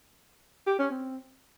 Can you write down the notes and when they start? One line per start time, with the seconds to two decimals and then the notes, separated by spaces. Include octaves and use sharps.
0.67 G4
0.79 C#4
0.91 C4